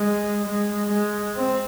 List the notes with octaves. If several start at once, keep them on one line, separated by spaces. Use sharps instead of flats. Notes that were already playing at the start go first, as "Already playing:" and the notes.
Already playing: G#3
G#3
G#3
C4